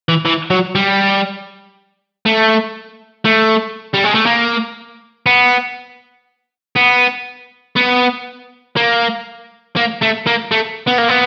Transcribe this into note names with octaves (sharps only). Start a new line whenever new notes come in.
E3
E3
F#3
G3
A3
A3
G3
G#3
A3
A#3
B3
B3
B3
A#3
A#3
A3
A#3
A3
B3
A#3
B3